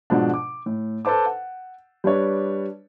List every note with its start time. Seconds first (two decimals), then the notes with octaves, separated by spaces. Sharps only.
0.10 G#2 B2 F3 D4
0.34 D6
0.66 A2
1.05 A4 B4 C5 A5 D6
1.26 F#5
2.04 G3 D4 B4 C#5 D5